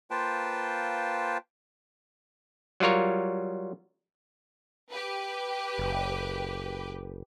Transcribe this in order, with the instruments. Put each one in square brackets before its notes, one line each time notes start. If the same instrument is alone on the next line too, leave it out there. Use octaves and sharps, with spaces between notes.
[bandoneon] A#3 F4 B4 C5 G5 A5
[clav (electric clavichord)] F#3 G3 F4 A#4 C#5
[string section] G4 B4
[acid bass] F#1